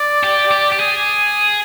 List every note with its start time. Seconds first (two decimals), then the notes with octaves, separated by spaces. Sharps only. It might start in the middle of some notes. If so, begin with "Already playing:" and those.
Already playing: D5
0.24 G4
0.51 G4
0.72 G4
0.80 G#4